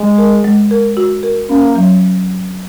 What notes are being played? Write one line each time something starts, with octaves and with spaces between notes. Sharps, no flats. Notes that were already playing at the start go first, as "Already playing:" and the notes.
Already playing: G#3 D#5
A#4
G#3
A#4
F#4
A#4
A#3 C#4
F#3